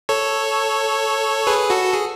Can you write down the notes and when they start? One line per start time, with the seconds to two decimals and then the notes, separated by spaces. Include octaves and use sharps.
0.09 A4 C#5
1.47 G#4 B4
1.70 F#4 A4
1.93 G#4